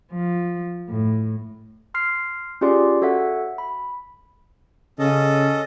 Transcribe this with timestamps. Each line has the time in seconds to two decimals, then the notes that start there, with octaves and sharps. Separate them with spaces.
0.13 F3
0.89 A2
1.94 C6 F6 C7
2.61 C#4 F4 G4 G#4 D5 C6
3.02 F#4 A4 C#5 E5 F#5
3.58 B5
4.99 C#3 C#4 A4 D#5